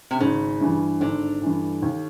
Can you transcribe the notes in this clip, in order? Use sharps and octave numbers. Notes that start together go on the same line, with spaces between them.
C3
G#1 C#3
G2 E3
G#1 D3
G2 E3
D#2